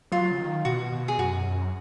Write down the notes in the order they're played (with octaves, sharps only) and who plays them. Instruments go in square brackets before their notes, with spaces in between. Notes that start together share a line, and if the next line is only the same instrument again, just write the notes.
[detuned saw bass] F#3 [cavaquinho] F4
[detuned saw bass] C#3
D#3
[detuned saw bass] B2 [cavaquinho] F#4
[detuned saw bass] B2
[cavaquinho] G#4
[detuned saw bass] F#2 [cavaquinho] F#4
[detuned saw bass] F#2